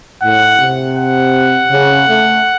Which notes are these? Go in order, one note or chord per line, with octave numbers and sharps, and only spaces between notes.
A2 F#5
C3
F#5
C#3
A3